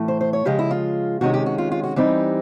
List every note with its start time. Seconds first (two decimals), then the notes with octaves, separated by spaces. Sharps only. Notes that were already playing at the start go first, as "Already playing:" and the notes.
Already playing: A2 E3 A3
0.08 C5
0.21 C5
0.33 C#5
0.45 C#3 F3 G#3 G4
0.59 E4
0.71 F4
1.21 C3 D#3 G#3 C#4 F#4
1.34 G4
1.46 F#4
1.58 F4
1.72 F4
1.83 F#4
1.96 E3 G3 C4 D#4 G4